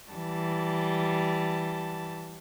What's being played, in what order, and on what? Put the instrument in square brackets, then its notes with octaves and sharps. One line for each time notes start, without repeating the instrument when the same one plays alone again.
[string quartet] E3 G3 A5